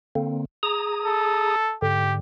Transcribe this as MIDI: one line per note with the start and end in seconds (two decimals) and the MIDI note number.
0.15 0.45 50
0.15 0.45 58
0.15 0.45 60
0.63 1.56 68
0.63 1.56 82
0.63 1.56 87
1.05 1.74 69
1.82 2.20 44
1.82 2.20 50
1.82 2.14 67